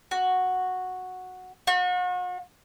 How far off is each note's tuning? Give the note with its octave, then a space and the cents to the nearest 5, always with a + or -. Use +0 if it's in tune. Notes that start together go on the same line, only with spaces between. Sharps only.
F#4 -5
F#4 -40